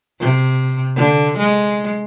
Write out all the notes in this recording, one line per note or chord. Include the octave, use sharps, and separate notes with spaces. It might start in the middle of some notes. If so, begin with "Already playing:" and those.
C3
D3
G#3